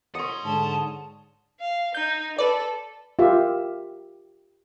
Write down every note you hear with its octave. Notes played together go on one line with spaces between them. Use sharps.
C#5 D#5 F#5 C6
G#2 D3 A5
F5
D#4 G6
A4 B4 D5
F4 G4 A#4 E5